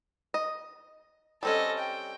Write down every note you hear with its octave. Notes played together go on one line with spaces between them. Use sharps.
D#5
G3 C4 C#4 A4 D#5
G5